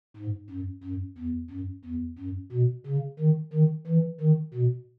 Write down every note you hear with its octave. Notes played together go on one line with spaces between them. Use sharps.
G#2
F#2
F#2
E2
F#2
E2
F#2
B2
C#3
D#3
D#3
E3
D#3
B2